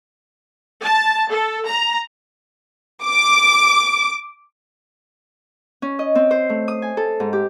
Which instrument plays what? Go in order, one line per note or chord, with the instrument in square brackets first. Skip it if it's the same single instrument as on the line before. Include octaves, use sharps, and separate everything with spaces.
[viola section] A5
A4
A#5
[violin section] D6
[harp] C#4
D#5
C4
C5
A3
D#6
G#5
A4
G#2
G4